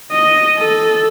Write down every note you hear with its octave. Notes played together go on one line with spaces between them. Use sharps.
D#5
A4